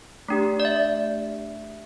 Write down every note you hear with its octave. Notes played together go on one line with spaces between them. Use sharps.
A3 D4 G4
D5
E5